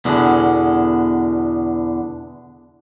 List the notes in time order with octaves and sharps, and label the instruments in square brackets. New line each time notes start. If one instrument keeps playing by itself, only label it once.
[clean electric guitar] E2 B2 D3